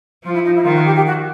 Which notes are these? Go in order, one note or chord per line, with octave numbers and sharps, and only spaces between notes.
F3 F4
E4
D#4
E4
D#3 F4
F#4
G4
G4
F#4